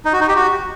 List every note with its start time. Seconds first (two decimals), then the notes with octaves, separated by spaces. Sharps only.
0.05 D#4
0.13 F#4
0.21 D#4
0.28 G4
0.36 F#4